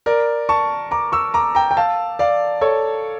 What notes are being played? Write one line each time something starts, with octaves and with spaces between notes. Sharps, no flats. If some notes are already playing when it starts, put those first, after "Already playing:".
A#4 D5
A5 C#6
A#5 D6
C#6 E6
A#5 D6
G5 A#5
G5
F5 A5
D5 F5
A4 C#5